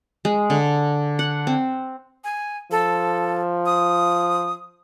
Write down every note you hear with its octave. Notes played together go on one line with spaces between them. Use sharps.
G#3
D3
F#5
C4
G#5
F3 A4
D#6